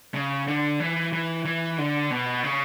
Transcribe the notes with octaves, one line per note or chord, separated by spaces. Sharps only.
C#3
D3
E3
E3
E3
D3
B2
C#3